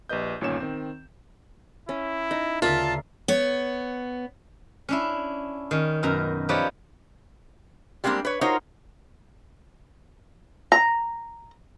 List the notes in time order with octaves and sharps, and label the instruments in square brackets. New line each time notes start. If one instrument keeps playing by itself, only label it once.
[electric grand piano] A#1 G4 B4 D#5 G6
G1 A#2 D#3 C#4 C#5 E7
D#3 C4
[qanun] C#4 [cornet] E4
[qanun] D#4
[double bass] D2 C#3 [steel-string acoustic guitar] F4 [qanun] A#4 D5 E5 [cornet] A5
[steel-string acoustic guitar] B3 C#5
[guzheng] C#4 D4 E4
D#3 C#4
F#2 B2 A#4 A#5
F3 D#4 G4 B4 C#5 D5
[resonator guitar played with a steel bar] G3 G#3 A#3 C4 D4
B4 C#5
D#4 F4 F#4 A#4 C5 C#5
[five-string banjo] A#5